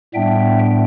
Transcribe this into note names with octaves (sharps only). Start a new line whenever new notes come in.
A2 G3 B3 D4 E5 G5